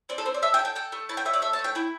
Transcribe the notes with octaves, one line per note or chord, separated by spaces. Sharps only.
C4 D5
A4
C4 C5
D5
A4 E5
G5
A4
G5
A4 G5
A3
E4 A5
G5
A3 E5
D5
A4 E5
A5
A3
G5
E4 G5